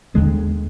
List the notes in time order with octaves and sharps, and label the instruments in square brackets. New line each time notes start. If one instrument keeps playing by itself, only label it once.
[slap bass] D#2 D3 G#3 B3